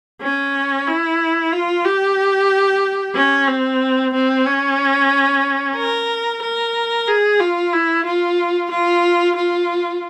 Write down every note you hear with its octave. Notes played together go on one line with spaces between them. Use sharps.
C#4
E4
F4
G4
C#4
C4
C4
C#4
A#4
A#4
G#4
F4
E4
F4
F4
F4